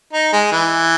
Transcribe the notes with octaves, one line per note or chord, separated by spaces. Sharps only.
D#4
G#3
E3